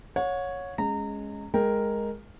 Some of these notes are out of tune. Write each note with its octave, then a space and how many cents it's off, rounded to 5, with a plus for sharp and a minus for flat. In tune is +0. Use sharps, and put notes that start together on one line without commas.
C#5 +0 F#5 -40
G#3 +0 C#4 +0 A#5 -25
G#3 +0 A#4 +0 G5 +0